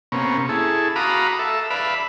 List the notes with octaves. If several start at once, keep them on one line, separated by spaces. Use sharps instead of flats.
C3 A#3 B3 C#4
E4 G#4 A4
F#4 F5 A#5 B5 D6 D#6
A4 E5
B4 D5 E5 F5 B5